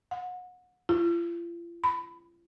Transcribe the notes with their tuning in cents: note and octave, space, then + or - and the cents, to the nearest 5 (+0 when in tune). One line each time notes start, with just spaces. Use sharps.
F#5 -30
F4 -40
B5 +20